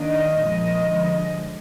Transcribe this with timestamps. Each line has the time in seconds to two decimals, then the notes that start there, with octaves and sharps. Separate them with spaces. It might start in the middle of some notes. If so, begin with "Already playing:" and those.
Already playing: D#3 A#3 D4 D#5
0.41 A#2 F3 G#3
0.89 D3 F3 G#3